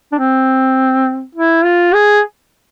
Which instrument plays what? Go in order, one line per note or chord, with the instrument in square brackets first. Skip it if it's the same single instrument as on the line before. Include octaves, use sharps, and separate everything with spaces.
[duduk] D4
C4
E4
F4
G#4